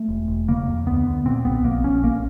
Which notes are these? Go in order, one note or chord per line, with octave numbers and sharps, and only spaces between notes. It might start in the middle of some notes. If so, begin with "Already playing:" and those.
Already playing: A3
E1
E1
C#3 A#3
F2
D2 B3
D2
A#2 C4
B1 B3
A#1 A#3
A#1 C#4
A1 A#3